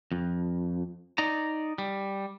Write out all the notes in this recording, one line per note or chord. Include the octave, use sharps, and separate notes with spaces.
F2
D#4 D5 A#5
G3